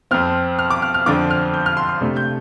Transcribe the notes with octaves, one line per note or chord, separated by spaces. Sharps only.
F2 F3 C4 F6
F6
D6
F6
F6
F2 D3 F3 C4 D6
F6
G6
F6
C6
C6
C3 A3 D4
G6